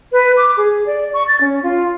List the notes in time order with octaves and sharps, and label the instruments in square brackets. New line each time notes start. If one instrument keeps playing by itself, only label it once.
[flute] B4
D6
G#4
D5
C#6
A6
C#4
F4